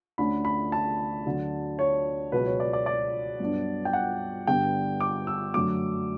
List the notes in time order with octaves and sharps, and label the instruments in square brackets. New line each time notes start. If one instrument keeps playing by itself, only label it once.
[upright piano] D2 D3 A3 C#4 B5
B5
A5
D2 D3 F#3
C#5
C#2 B2 F#3 B4
C#5
D5
D5
D5
G2 F#3 B3 D4
G5
F#5
G2 D3 G3 B3 G5
D6
E6
F#2 D3 F#3 A3 D6